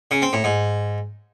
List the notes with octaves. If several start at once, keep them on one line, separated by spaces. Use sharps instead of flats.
C#3
C4
A2
G#2